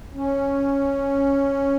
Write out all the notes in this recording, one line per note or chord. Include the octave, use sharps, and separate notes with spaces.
C#4